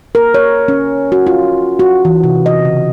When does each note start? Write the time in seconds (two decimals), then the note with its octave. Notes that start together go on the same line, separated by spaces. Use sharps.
0.15 A#4
0.34 C#5
0.68 C#4
1.12 F#4
1.27 F4
1.79 F#4
2.05 E3
2.24 C3
2.46 D#5
2.65 C#3